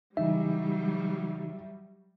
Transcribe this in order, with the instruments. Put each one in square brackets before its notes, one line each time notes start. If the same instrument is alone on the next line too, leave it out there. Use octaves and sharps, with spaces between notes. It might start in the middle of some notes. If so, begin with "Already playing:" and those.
[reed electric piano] C#3 E3 D#4 [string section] F#3 G3 [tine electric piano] E5